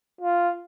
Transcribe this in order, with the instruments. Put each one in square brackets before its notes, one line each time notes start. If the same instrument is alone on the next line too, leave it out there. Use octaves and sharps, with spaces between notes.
[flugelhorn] F4